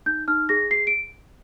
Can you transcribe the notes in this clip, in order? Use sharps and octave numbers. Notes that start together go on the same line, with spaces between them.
D#4 G6
D#4 F6
G#4 A#6
G#4 C7
D7